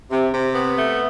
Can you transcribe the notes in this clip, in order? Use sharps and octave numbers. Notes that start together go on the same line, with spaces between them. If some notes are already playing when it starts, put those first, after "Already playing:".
C3
C3
B3
A3